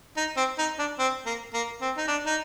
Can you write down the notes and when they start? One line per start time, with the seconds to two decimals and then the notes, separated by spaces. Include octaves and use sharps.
0.17 D#4
0.37 C4
0.58 D#4
0.79 D4
0.99 C4
1.26 A#3
1.53 A#3
1.81 C4
1.97 D#4
2.08 D4
2.26 D#4